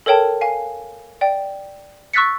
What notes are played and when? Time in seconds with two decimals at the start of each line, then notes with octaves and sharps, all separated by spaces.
0.06 A4 A#4 C#5 G5 A5
0.41 F5 G#5
1.21 D5 G5
2.13 C#6 E6 F#6 A6 B6 C#7